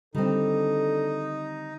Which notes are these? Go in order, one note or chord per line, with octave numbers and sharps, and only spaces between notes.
D3 D#3 G3 C4 D4 D#4 A4